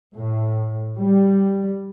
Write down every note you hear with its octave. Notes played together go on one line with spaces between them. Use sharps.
A2
G3